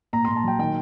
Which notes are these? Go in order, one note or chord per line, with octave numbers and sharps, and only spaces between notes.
A#2 A#5
A#2 C6
A5
F#3 G5
D#3 G5